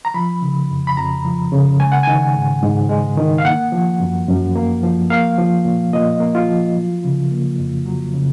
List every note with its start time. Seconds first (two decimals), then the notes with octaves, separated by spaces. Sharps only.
0.05 A#5
0.14 F3 B5
0.42 C#3
0.70 F2
0.87 B5
0.97 F2 A#5
1.25 F3
1.52 C#3
1.79 G#3 G#5
1.92 F#5
2.03 D#3 G#5
2.35 G#2
2.62 G#2
2.89 G#3
3.18 D#3
3.38 F5
3.45 A#3 F#5
3.72 F3
4.00 F#2
4.28 F#2
4.56 A#3
4.83 F3
5.10 A#3 F5
5.38 F3
5.65 A#2
5.93 A#2 D#5
6.20 A#3
6.35 F4
6.49 F3
6.75 F#3
7.04 C#3
7.31 A#3
7.58 F2
7.86 F#3
8.14 C#3